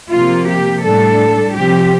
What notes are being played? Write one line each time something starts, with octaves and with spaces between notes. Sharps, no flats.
C3 F3 A#3 F4
G4
A2 G3 D4 A4
C3 F3 C4 G4